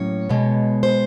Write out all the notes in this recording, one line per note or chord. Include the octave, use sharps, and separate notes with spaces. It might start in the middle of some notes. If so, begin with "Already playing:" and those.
Already playing: A2 F#3 A#3 C#4 C#5
B2 G#3 B3
C5